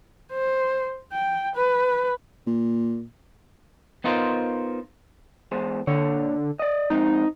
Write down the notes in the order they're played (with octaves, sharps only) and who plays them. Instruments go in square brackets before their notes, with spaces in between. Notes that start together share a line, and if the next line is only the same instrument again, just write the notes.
[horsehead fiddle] C5
G5
B4
[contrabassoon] A#2
[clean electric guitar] B3 D#4 F4 A#4 C5
E2 G#3 C5
[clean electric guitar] A#2 C#5 [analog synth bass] D3
[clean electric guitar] D5 D#5
[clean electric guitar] F3 G#3 C4 [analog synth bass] D#4